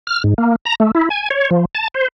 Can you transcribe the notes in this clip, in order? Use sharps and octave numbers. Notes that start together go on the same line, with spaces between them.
F6
G#2
A#3
A#5
A3
E4
G#5
C#5
F3
A5
C5